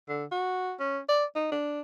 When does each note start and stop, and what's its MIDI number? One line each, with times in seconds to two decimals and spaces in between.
0.09 0.25 50
0.32 0.73 66
0.80 0.99 61
1.09 1.25 74
1.35 1.49 63
1.51 1.81 62